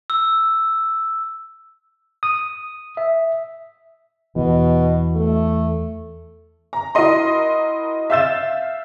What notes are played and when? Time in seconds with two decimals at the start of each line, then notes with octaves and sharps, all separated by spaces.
0.10 E6
2.23 D#6
2.97 E5
4.36 E2 B2 E3
5.16 A3
6.73 A#5
6.95 E4 F#4 A#4 D#5 C6
8.10 E5 F5 E6 G6 A6 E7